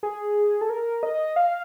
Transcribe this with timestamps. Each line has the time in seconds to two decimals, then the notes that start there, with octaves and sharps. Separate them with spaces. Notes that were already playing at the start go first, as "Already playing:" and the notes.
0.03 G#4
0.61 A4
0.70 A#4
1.03 D#5
1.36 F5